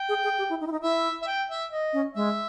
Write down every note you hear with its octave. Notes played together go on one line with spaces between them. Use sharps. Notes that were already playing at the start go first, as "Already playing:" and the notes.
Already playing: G5
G#4
G#4
G4
E4
D#4
E4
D#4
E4 E5
E5
G5
E5
D#5
C#4
G#3 E5